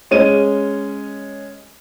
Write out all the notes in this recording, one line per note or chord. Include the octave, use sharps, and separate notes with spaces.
G#3 C#4 D#7